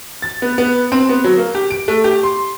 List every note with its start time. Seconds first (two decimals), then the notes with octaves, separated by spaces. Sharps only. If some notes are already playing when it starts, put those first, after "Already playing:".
0.22 A6
0.42 B3
0.58 B3
0.92 C4
1.09 B3
1.24 F#3
1.38 A#3
1.55 G4
1.71 D7
1.88 A3
2.04 G4
2.23 C6